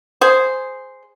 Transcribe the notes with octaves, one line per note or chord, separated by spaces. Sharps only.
G#4 C5